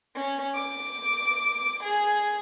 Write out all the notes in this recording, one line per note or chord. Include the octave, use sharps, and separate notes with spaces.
C#4
D6
G#4